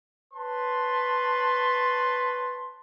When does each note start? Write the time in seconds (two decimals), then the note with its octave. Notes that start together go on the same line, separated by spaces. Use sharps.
0.33 B4 C#5 A5 C6